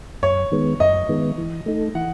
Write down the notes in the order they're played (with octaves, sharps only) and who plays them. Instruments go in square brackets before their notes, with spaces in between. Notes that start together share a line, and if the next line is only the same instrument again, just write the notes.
[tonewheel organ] F#2 [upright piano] C#5
[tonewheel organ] D#3 G#3 B3
[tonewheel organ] F#2 [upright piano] D#5
[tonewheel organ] D#3 G#3 B3
E3
A3 D#4 A4
[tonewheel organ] E3 [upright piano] F#5